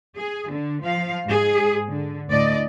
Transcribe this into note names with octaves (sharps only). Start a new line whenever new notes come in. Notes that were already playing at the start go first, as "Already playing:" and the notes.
G#4
D3
F3 F5
G#2 G#4
D3
D2 A2 D5 D#5